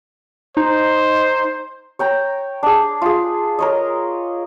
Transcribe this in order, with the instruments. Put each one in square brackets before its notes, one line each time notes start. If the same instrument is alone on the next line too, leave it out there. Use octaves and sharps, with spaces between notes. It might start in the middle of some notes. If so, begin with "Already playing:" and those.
[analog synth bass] D#4 [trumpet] C5
[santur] C#5 G5 A#5
D4 G#4
F4 G#4
A#4 C#5 D#5